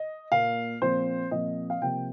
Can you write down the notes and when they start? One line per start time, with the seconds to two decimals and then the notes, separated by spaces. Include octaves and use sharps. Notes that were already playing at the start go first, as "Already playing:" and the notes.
Already playing: D#5
0.31 A#2 A#3 F5
0.81 A#2 F3 C4 C5
1.31 A#2 F3 C4 D#5
1.70 F5
1.82 C3 F3 A#3 G5